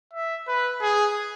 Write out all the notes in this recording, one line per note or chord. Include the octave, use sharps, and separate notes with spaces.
E5
B4
G#4